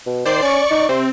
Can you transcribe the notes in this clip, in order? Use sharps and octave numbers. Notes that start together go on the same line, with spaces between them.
B2
D#3 C5 D5 C7
C#4 D5 C#6
D#4
C3 C4